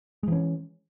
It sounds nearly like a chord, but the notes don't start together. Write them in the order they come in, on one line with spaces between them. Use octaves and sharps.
G#3 E3 C#4